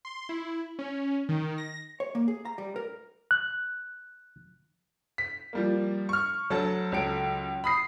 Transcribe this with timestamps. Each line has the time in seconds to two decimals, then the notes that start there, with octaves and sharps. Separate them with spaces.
0.05 C6
0.29 E4
0.79 C#4
1.29 D#3
1.58 A#6
2.00 C#5
2.15 A#3
2.28 G#4
2.45 A#5
2.58 G3
2.76 A#4
3.31 F#6
5.18 B6
5.53 F3 G3 A#3
6.09 C#6 F6
6.50 D2 F#3 A4 A5
6.92 C#2 F#3 A4 D7
7.64 B5 D#6 C7